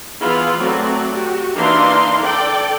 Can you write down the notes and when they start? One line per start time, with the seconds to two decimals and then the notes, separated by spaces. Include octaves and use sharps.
0.21 E3 B3 F4 G#4 B5
0.59 F#3 A3 C4 F#4 D5
1.14 F#4 G4
1.54 E3 A#3 D4 D#4 F5 C6
2.21 A4 D5 G5